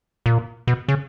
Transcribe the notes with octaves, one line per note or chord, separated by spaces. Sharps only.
A#2
B2
C#3